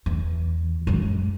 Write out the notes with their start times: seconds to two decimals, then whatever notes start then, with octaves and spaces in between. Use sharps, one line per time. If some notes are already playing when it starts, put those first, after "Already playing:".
0.06 E2
0.87 F#2 G#3